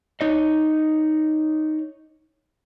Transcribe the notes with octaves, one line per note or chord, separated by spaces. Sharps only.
D#4 C#5 D#5